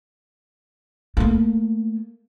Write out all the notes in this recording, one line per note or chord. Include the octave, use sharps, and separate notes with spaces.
A3 A#3